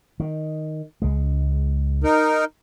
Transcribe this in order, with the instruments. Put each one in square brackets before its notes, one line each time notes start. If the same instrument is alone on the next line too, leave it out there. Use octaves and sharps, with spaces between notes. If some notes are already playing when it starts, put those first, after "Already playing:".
[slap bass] D#3
C#2 G#3
[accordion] D#4 A#4